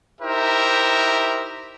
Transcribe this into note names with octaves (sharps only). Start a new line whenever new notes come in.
D#4 E4 G4 A#4 C5 E5